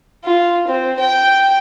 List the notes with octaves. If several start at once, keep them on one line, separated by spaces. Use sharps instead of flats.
F4
C4
G5